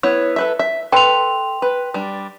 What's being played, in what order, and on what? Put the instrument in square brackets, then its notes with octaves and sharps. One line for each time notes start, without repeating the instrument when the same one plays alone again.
[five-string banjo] B3 E4 C#5
A4 B4 E5
E5
[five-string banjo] A4 B4 A5 [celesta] G5 C6 F7
[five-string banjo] B4
G3 D4